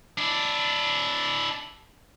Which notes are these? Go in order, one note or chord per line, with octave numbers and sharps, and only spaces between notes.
D4 E4